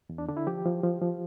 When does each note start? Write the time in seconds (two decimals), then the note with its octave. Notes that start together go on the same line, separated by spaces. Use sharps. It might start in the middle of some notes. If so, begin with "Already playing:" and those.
0.09 E2
0.18 D4
0.28 D3 D4
0.37 E4
0.47 F3 G4
0.65 F3
0.83 F3
1.01 F3